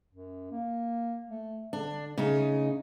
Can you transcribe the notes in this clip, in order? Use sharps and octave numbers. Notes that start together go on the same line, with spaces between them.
F#2
A#3
A3
D3 D4
C#3 A3 D#4